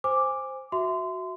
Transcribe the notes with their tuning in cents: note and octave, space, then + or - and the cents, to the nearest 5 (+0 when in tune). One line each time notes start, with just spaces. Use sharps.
C5 +0 G#5 -20 D6 +0
F#4 +0 E5 +0 C6 -25